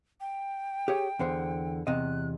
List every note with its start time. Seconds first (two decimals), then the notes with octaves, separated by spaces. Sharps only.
0.20 G5
0.88 G4 G#4 C#5
1.19 E2 D3 C5
1.87 E2 C3 D#5 F#6